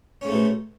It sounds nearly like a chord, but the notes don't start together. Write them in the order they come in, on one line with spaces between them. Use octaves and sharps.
C#4 G#2 A3 B2